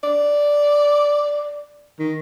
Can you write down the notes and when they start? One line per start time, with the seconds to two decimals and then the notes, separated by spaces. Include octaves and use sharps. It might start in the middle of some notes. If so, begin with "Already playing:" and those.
0.03 D5
1.99 D#3